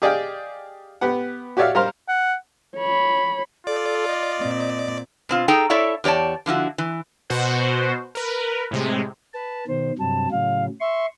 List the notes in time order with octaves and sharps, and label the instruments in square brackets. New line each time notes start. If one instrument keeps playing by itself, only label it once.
[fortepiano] G4 G#4 D5 D#5 F5 G5
B3 G4 B4 F#5
F#4 G4 C#5 D5 E5 F5
G3 A#4 C5 F5 A#5 C6
[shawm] F#5
[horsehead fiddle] C#5 B5
[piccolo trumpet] F4 [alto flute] A4 [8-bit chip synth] D5
[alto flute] D#5
[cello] A#2 C4
[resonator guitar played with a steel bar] B2 C4 F4
D#4 G#4 A4 G5 A#5
E4 A4 C#5 D5 E5
E2 G4 C#5 D5 A5
D3 F3 E4 F#4
E3
[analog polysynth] B2 F#4 C5 F#5
A#4 B4
A2 C3 G#3
[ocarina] B4 [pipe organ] A5
[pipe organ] B2 D#3 [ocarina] C5
[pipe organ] G2 C3 F#3 [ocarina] A5
[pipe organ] A2 C#3 F#3 [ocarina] F5
[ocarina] E5 [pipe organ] C6 C#6